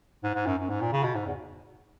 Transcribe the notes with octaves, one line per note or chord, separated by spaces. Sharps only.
G#2
G#2
F#2
F#2
G#2
A#2
C#3
B2
G#2
E2